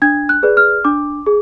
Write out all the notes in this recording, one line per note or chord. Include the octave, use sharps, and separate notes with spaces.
D4 G#6
F#6
G#4 B4 D5
F6
D4 D6
G#4